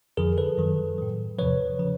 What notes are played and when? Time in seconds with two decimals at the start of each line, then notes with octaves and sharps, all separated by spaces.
0.17 F2 D3 F3 G#4 A#4
0.37 A4 B4
0.58 F#2 D#3 F#3
0.98 A2 F#3
1.38 E2 C3 F3 B4 C#5
1.79 C#3 F3